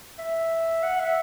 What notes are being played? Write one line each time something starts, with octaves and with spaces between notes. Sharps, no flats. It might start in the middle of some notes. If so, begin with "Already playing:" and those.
E5
F#5
E5